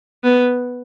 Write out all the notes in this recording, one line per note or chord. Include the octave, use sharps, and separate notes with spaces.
B3